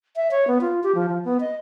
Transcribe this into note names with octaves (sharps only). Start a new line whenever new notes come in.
E5
C#5
B3
F4
G4
F3
F3
B3
D#5